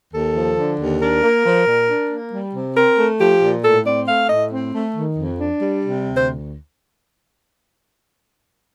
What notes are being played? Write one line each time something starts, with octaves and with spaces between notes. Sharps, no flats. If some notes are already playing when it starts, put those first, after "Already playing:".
D#2 A4
F3
D3
D#2
D4 A#4
A#3
F3
A#2
D4
A#3
G3
C3
C4 A#4
A3
F3 G4
A#2
A2 A4
C4 D5
A3 F5
A2 D#5
C4
A3
D#3
F2
D4
G3
C3
D2
C5